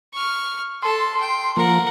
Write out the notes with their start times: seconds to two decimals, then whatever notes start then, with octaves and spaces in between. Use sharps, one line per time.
0.14 C#6 F6
0.83 A4 A5 C6
1.20 G5
1.57 F3 A#3 A#4 F#5